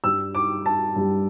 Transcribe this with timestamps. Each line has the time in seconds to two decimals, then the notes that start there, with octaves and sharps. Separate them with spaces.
0.04 G2 G3 E6
0.35 D6
0.66 A5
0.96 G2 G3